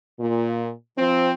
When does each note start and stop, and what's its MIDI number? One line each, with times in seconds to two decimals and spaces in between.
0.20 0.71 46
0.98 1.32 53
0.98 1.32 60